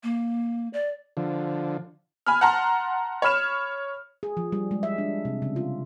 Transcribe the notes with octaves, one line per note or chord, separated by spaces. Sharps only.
A#3
D5
D3 F3
G#5 B5 F6
F#5 A5 A#5 C6
C#5 B5 F6 E7
G#4
F3
G3
G#3
E5
D4
C3
C#3
F4